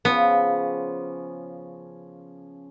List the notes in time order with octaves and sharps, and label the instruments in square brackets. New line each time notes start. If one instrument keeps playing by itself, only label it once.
[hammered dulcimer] C#3 F3 C6 [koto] B3